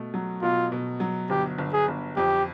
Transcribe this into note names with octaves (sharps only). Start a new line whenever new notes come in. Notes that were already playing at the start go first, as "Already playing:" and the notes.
Already playing: B2 A3
F#3
B2 F4
B2
F#3
G1 G4
G1
G#4
G1
F2 G4